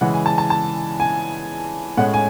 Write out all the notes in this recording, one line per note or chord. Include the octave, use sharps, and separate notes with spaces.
C#3 E3 G#3 F#5
G#5
A5
A5
A5
G#5
A2 G#3 C#4 F#5
G#5